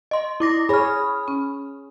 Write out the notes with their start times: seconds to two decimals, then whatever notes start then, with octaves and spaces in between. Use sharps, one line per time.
0.11 D#5 C6
0.40 E4 D6 A#6
0.69 G#4 C#5 B5 F6
1.28 C#4